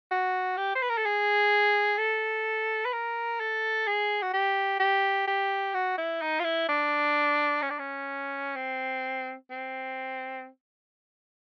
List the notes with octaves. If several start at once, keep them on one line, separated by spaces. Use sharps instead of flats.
F#4
G4
C5
B4
A#4
A4
G#4
A4
B4
A#4
A4
G#4
F#4
G4
G4
G4
F#4
E4
D#4
F4
E4
D4
C#4
D4
C#4
C4
C4